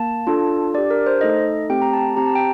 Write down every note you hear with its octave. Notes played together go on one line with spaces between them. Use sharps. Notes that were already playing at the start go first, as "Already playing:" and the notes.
Already playing: A#3 A5
D4 F4 A4
D4 G4 D5
A#4
C5
A3 D#4 A4 D#5
A3 C4 G4 G5
A#5
A5
C4 G4 A#5
A5
G5